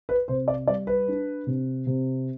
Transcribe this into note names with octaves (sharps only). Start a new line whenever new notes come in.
B4
C3 C5
D5
G3 D5
B4
D4
C3
C3